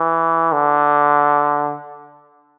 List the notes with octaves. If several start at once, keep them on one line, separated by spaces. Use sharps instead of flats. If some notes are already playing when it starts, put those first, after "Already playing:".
Already playing: E3
D3